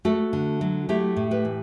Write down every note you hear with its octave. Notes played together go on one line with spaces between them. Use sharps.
A3 F#4 A4
D3
F#3
A3 E4 G4
A2
G4 B4
E3